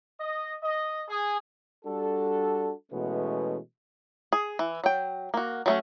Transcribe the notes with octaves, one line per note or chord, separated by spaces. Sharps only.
D#5
D#5
G#4
G3 D4 F#4 A4
B2 E3 G#3 A3 B3 C#4
G#4
E3
F#3 G5
A#3 F#4
F#3 A3 C#4